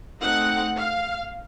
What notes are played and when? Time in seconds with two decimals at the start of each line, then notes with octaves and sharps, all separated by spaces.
0.21 A3 C4 D#4 F#5
0.76 F5